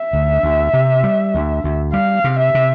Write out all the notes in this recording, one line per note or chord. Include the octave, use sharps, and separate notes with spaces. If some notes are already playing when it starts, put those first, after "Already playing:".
Already playing: E5
D2
D2
C3
G3
D2
D2
G3 F5
C3
E5
C3